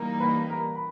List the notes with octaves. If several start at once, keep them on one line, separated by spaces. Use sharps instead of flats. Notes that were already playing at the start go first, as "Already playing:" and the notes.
Already playing: E3 G3 A#3 D#4 A#4 A#5
B4 B5
A#4 A#5
B5